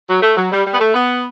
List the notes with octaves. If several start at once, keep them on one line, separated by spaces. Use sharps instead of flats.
F#3
A3
F#3
G3
G3
B3
A3
B3